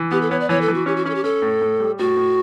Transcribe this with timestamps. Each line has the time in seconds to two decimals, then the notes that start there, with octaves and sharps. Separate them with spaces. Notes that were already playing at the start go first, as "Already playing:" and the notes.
Already playing: E3
0.11 B3 G4
0.22 A4
0.31 B3 C#5
0.40 D5
0.49 E3 C#5
0.61 A4
0.68 E3
0.74 F#4
0.86 C#4 G4
0.96 F#4
1.05 C#4 E4
1.10 A4
1.15 G4
1.24 C#4 A4
1.42 A2
1.61 A2
1.80 G3
1.99 A2 F#4
2.17 A2